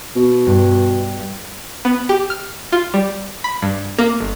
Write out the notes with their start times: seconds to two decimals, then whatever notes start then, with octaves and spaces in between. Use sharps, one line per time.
0.16 B2
0.47 G2
1.85 B3
2.09 G4
2.30 F6
2.72 F4
2.94 G3
3.44 B5
3.62 G2
3.99 A#3
4.21 G1